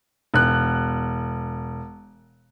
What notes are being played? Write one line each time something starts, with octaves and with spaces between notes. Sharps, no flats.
E1 F#6